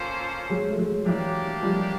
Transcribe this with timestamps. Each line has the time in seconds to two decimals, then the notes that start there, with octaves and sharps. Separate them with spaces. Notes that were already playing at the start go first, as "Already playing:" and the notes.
Already playing: A#3 C#4 F4 A4 C5
0.50 F#3 G#3
0.70 A3
0.78 F#3 G#3
1.06 E3 F#3 A#3 D4 G4
1.62 F3 G3